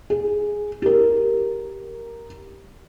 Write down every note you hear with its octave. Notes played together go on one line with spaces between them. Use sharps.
G#4
G4 A#4